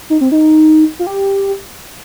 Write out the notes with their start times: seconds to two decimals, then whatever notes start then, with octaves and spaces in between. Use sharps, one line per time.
0.10 D#4
0.21 C4
0.32 D#4
0.99 F4
1.07 G4